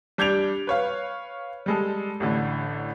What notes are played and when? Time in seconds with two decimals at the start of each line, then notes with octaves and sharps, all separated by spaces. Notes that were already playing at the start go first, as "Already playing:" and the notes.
0.18 G3 D4 G6 G#6 D7 F7
0.67 B4 C#5 F5
1.66 G3 G#3 A4
2.20 A1 A2 D3